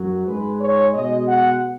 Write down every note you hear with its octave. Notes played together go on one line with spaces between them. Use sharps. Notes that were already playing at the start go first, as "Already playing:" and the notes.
Already playing: F#2 F#3
G#2 G#3 B4
C#5
B2 G#3 D#5
F#5